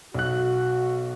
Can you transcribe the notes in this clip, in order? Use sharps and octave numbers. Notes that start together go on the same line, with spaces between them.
B1 F#4 F#6